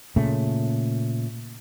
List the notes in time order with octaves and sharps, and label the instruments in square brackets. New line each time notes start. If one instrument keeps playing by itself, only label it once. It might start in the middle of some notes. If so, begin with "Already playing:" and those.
[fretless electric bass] A#2 C#3 A3